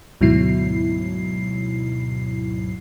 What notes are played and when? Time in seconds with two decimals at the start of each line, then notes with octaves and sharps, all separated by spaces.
0.21 D2 G#2 B2 F#3 E4 C7